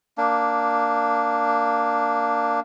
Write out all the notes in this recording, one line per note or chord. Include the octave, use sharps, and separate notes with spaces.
A#3 D4